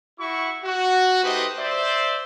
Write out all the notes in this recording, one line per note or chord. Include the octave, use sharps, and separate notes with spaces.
E4 F#4 C#6
F#4
A3 D#4 G4 B4 C5 D#5
C5 D5 E5